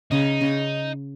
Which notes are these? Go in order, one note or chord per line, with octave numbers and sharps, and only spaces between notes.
C#3 D#4
C#3